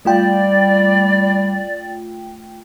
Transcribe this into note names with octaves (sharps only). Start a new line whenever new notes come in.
G3 A3 F4 D5 G5